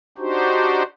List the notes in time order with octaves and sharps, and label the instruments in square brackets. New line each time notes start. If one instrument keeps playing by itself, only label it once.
[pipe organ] D4 D#4 F#4 G4 C5